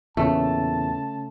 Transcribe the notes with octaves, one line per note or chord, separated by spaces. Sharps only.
E2 A#2 C#3 A3 C#4 A5